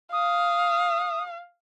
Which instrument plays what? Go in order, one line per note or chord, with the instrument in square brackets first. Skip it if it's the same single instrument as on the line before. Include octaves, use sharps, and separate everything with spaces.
[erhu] F5 [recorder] D#6